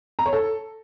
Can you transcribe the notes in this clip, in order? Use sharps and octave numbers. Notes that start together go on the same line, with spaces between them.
A#5
C#5
A4